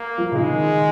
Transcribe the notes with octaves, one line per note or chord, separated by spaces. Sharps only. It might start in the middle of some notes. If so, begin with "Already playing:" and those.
Already playing: A#3
F3
C#3
D#3 G#3